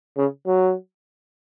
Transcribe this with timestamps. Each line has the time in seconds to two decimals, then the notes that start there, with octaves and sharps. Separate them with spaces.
0.17 C#3
0.47 F#3